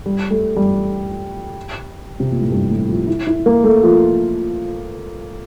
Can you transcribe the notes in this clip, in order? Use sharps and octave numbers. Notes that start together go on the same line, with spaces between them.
G3
A3
G3
C3
A#2
A2
G2
A2
F3
E4
E4
A#3
A3
F3